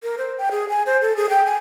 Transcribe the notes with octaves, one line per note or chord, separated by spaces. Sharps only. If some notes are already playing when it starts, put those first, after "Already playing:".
A#4
C5
G5
G#4
G#5
C5
A4
G#4
G5
G#5